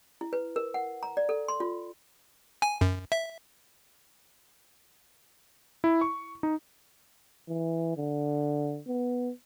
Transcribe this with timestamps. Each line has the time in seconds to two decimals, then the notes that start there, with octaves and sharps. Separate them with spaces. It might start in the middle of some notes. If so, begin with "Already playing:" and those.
0.21 E4
0.33 B4
0.56 A#4
0.74 F#5
1.03 A#5
1.17 D5
1.29 A4
1.48 C6
1.60 F4
2.62 G#5
2.81 F#2
3.12 E5
5.84 E4
6.01 C#6
6.43 D#4
7.49 E3
7.97 D3
8.88 B3